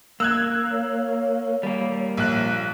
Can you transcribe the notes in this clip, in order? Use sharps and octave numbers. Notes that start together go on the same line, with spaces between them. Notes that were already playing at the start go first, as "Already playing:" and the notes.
A#3 E6 F#6 G#6
C#5
G3 A#3
A#1 F#6